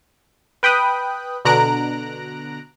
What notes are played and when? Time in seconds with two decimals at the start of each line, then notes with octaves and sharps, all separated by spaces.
0.63 B4 G5 B5 D#6 F#6
1.45 B2 D3 A#5 F#6 A#6 D7